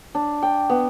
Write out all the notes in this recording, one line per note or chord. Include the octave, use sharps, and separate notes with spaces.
D4
G5
B3